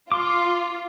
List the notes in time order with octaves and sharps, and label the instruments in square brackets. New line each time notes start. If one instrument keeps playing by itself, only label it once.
[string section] F4 [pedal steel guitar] C6 D6